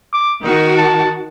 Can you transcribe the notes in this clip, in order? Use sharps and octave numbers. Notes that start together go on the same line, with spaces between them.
D6
D#3 D#4 F#4
A5